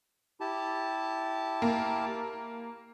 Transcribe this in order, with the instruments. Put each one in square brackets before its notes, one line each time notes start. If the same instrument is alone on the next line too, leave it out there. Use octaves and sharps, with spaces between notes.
[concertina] E4 G4 A5
[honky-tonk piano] A#3